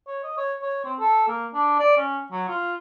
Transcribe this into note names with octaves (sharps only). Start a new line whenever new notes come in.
C#5
D#5
C#5
C#5
C4
A4
A#3
D4
D5
C#4
F#3
F4